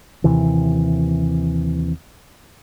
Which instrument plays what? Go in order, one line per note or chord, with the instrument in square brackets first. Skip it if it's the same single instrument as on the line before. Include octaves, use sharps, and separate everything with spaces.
[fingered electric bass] D#2 C3 E3